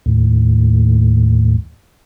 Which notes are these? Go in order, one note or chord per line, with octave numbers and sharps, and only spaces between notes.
D#2 A2